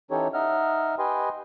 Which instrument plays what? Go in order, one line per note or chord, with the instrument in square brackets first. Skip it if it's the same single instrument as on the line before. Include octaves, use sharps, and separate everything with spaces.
[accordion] E3 C#4 D#4 G4 A4 C#5
D#4 D#5 E5 F#5 F6
G4 B4 D#5 G5 G#5 C6